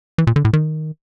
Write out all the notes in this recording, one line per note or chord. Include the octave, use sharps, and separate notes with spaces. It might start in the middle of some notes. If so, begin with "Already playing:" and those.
E3
A#2
D3
A2
D#3